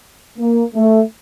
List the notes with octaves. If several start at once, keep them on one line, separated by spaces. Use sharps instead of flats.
A#3
A3